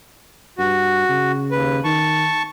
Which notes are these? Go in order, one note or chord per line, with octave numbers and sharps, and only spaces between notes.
G2 F#4
C#3
D#2 B4
D#3 A5 C#6